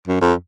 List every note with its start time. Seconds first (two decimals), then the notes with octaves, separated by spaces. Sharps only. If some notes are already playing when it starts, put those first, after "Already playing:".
0.08 F#2
0.21 F2